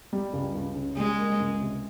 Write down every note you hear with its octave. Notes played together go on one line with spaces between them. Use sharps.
G3
C#2
C#2
C#3
G3 G#3
A#3
C#2
C3